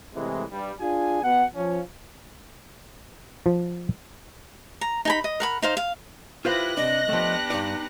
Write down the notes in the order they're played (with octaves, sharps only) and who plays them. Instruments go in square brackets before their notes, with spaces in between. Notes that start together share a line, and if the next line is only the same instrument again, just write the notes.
[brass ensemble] A2 C3 E3 G#3
G2 G3
D4 F4 G#4 G#5
B2 F#5
F3 C#4
[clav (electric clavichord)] F3
[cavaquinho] A#5
D#4 G#5 B5
D#5
A#4 F#5 B5
D#4 C5 F5
F5
[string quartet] E4 G4 B4 [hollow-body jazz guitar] F4 C5 F5 [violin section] F#6 A#6
[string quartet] C3 [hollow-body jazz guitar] D4 [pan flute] D#5
[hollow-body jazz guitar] F3 A3 [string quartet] B3 D4 G4
[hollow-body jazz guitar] G2 D5 [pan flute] D#4